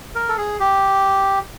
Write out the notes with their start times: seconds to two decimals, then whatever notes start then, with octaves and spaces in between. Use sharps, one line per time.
0.15 A#4
0.29 A4
0.37 G#4
0.60 G4